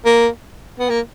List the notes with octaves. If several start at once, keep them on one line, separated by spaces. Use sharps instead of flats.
A#3
B3
A#3